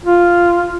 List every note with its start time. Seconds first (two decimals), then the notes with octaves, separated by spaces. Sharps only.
0.05 F4